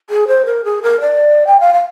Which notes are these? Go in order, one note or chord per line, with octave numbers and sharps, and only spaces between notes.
G#4
C5
A#4
G#4
A#4
D5
G5
F5
F5